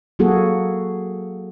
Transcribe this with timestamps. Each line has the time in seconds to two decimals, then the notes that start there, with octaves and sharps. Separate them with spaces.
0.19 F#3 A#3 F#4 G#4 A4